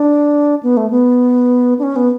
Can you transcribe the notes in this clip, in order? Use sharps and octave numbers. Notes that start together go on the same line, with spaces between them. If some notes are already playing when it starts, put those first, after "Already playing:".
Already playing: D4
B3
A3
B3
D4
C#4
B3